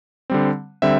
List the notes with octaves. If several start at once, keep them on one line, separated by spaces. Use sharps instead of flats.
D3 G3 C4
D3 G3 C4 E5